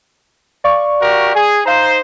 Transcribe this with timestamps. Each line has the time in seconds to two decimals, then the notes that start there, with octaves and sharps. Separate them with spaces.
0.64 D5 F5 C#6
1.01 F#4 G4 A#4
1.35 G#4 G#5
1.66 D#4 C5 F5 A#5